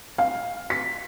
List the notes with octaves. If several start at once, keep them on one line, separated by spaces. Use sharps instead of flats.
F5
B6